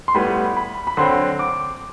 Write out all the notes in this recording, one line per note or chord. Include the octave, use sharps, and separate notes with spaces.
C6
A2 G3 B3 B5
B5
B5
D3 F#3 C4 C6
D6